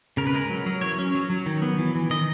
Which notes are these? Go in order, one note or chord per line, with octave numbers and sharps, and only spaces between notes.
C#3 A#4
B4
G#3 A#4
F#3
F#3
E3 C#5
C#4
F#3
F#3
D#3
B3
E3
E3
D#3 D#5